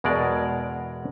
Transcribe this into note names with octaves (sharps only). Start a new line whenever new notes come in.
E2 B2 G#3 A#4 D5